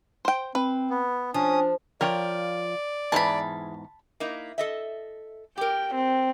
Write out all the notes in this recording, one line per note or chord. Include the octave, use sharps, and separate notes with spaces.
C5 G5
C4 B4
B3
F3 C#4 D4 D#6
F3 F4 A#4 C#5 D5 G5
E2 G#2 E3 G#3 G#4 A5 B5
A#3 D#4 E4
A4 D#5 E5
G4 A#4 G5
C4